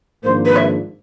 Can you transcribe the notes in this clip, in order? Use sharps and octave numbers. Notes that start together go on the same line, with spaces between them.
G#1 G#2 F3 A#3 D4 C5
B4
E5